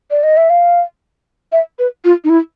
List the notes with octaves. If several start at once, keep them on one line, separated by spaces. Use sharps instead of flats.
D5
D#5
E5
F5
E5
B4
F4
D#4
E4